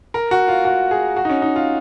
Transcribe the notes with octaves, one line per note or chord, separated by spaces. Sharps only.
A#4
F#4
F4
F#4
G#4
F#4
D#4
C#4
D#4
F4